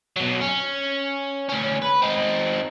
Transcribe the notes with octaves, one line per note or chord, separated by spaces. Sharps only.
B2 F#3
C#4
D2 C#4
B4
C4 D#4